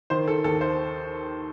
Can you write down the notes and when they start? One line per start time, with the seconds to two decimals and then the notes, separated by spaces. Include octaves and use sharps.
0.10 D#3 C5
0.28 A4
0.44 D#2 A4
0.61 C5